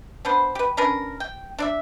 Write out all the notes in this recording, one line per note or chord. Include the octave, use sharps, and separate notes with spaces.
B3 D4 B4 C5
G4 B4
C#4 D4 A#4 B4
G5
D4 D5 E5